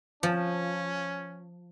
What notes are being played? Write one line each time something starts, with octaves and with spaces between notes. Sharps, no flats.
F3 C#4